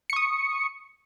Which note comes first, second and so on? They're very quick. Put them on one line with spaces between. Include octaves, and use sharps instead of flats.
C#7 C#6 D#6